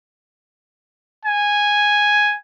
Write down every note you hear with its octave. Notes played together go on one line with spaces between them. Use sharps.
G#5